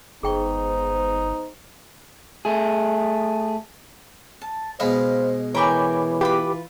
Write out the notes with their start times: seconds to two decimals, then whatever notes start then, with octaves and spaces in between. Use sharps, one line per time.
0.23 G1 G#2 B3 D#4 G#4 C5 G5 C#6
2.45 A3 G#4
4.42 A5
4.80 B2 G#3 C5 D#5 F5 B5
5.55 E3 A#4 C#5 G5 G#5 B5 D6
6.21 F4 G4 B4 B5 D6